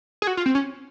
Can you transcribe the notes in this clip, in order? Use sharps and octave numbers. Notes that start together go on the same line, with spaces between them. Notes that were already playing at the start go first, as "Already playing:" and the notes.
G#4
F#4
F4
C4
C#4